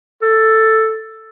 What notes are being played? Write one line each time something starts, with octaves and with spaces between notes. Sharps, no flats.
A4